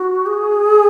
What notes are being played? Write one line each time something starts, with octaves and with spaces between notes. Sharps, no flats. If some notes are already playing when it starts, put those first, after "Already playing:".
Already playing: F#4
G#4